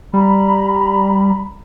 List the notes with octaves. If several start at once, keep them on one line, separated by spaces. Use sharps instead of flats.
G3 A#5 B5